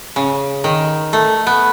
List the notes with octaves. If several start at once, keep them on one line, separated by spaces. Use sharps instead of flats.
C#3
D#3
A3
B3